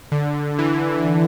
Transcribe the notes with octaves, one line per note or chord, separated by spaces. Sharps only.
D3
E3